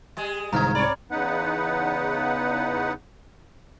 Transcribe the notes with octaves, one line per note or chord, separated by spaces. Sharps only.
G3 G#3 G#4
C2 G#2 D3 F3 D#4 A#5 F6 G#6
C4 C#5 D5 B5
E2 C#3 B3 D#4 B4 F#5